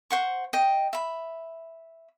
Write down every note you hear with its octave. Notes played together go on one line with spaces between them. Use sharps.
C5 F#5 C#6
D#5 G5
E5 B5